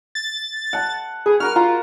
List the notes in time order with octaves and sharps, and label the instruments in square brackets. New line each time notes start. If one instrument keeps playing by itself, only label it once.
[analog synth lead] A6
[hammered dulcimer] F#5 A5
[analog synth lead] G#4 [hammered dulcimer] B4
[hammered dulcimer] F#4 A#4 B4 [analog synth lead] F6
[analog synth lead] F4 [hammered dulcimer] A#5